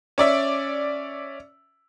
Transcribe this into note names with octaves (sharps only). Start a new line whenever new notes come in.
C#4 D5 E5